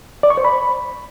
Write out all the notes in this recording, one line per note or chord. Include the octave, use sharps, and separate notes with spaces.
D5
C#6
C5
B5